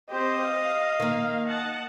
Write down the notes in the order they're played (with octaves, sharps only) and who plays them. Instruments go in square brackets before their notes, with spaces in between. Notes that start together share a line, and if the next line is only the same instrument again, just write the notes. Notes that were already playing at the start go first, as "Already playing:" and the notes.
[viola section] C4 G4 C5 [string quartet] D#5
[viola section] F5
[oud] D#3 A#3
[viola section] D#5 F#5 A5